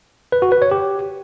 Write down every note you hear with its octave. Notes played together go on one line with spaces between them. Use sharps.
B4
F#4
B4
C#5
G4